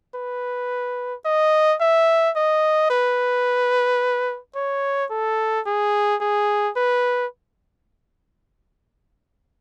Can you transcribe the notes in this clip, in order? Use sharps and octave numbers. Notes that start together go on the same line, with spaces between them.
B4
D#5
E5
D#5
B4
C#5
A4
G#4
G#4
B4